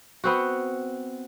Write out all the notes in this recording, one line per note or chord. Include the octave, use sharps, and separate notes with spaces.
B3 C4 F#4